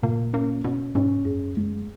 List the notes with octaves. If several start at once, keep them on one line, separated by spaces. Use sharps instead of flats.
A#2 A#3
A#3 C#4
B2 C#4
G#2 C#4
F#2 G#4
F2
F#2 G#3